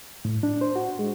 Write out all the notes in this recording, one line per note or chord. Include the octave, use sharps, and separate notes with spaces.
A2
D4
C5
F#4
G#3